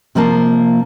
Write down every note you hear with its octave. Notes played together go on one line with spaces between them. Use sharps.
C3 F3 A#3 F4 A5